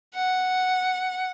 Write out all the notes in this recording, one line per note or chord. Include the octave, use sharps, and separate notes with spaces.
F#5